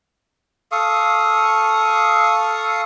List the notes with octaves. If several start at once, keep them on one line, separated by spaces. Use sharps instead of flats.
A4 F5 C#6 D#6